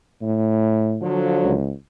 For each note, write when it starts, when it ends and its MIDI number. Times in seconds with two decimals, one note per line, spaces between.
0.22 1.01 45
1.02 1.53 50
1.02 1.53 53
1.02 1.53 54
1.44 1.72 37